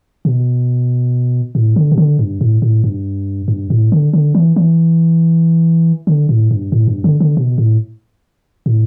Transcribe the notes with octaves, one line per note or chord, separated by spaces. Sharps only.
B2
A2
D3
B2
D3
G2
A2
A2
G2
G2
A2
D3
D3
E3
E3
D3
A2
G2
A2
G2
D3
D3
B2
A2
A2